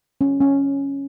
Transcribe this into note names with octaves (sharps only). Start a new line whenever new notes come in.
C#4
C#4